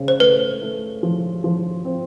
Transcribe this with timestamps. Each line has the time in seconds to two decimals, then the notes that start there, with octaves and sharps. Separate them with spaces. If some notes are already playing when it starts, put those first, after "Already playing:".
Already playing: C#3 C4
0.08 C5
0.20 A3 B4
0.62 A3
1.03 F3
1.44 F3
1.85 C4